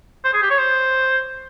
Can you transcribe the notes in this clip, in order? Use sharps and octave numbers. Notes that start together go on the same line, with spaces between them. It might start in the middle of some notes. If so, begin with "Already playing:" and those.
C5
G#4
G4
C#5
C5